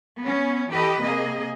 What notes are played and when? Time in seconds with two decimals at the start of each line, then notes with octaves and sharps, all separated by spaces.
0.20 B3 C#4
0.72 E3 G4 A4 B4 D#5
1.01 C3 A#3 G#4 D#5